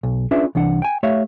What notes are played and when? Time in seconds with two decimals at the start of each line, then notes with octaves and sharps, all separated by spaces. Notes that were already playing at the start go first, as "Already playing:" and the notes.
0.03 B1
0.31 C#4 D4 F4 G#4 B4 E5
0.55 C2 E3 D4 F#5
0.82 G5 G#5
1.03 A3 G4 C#5 E5 F5